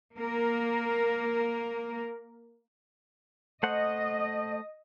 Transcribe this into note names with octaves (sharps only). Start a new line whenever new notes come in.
A#3 A#4
A3 C5 D#5 F#5